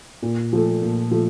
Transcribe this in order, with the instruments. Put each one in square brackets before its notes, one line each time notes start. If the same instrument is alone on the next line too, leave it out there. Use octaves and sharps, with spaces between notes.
[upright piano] A#2
F3 A3
A#2
F3 A3